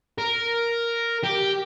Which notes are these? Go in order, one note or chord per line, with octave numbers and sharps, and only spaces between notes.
A#4
G4